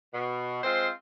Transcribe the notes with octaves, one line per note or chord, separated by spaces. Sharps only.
B2
G#3 C4 F4 C5